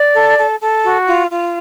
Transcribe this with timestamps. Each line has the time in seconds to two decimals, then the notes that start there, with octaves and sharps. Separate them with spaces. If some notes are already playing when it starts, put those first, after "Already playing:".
Already playing: D5
0.13 A4
0.38 A4
0.60 A4
0.83 F#4
1.07 F4
1.30 F4